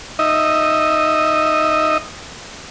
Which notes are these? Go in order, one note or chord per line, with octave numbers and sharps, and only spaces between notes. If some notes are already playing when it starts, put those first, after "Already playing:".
D#4 D#5 E5